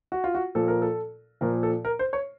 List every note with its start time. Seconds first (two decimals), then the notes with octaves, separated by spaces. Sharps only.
0.12 F#4
0.24 F4
0.35 F#4
0.55 A#2 F3 A4
0.68 A#4
0.82 A4
1.41 A#2 F3 A#4
1.63 A4
1.85 A#4
1.99 C5
2.13 C#5